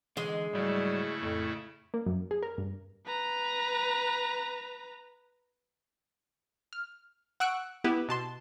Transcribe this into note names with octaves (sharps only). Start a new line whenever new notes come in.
D3 E3 G#3 D#5
G#2 C#3 F#3 G3 A3 E4
F2 A2
A#3
F#2
G#4
A#4
G2
B4 A#5
F6
F#5 C#6 E6 F#6 D7
B3 E4 G4 B4
B2 A5 C6